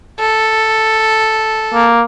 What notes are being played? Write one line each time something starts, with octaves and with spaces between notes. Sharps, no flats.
A4
A#3